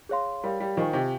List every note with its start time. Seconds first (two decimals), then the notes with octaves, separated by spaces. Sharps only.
0.09 G#4 C#5 F5 C6
0.44 G3 A#4 C#5 F5
0.60 G3
0.76 D#3 F4 C5 F5 G#5 C#6
0.93 C3